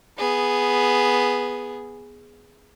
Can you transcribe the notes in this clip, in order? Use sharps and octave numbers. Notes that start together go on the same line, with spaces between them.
B3 G#4